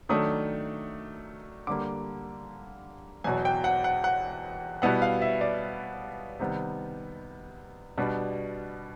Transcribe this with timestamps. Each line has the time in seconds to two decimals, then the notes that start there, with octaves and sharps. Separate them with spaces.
0.09 D#3 F#3 A3 D4 D#6
1.67 D3 G3 A#3 D6
3.24 E2 B2 F#3 G#5
3.45 G5
3.64 F#5
3.84 F#5
4.04 F#5
4.82 B2 G3 B3 E4 F#5
5.02 F5
5.22 E5
5.41 D5
6.39 C3 D#3 G3 B3
7.97 B2 G3 B3 D4